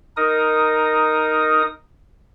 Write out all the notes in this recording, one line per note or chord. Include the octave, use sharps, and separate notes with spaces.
D#4 A#4 D#6